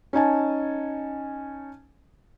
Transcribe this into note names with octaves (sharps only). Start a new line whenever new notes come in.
C#4 D#4 G#5 A5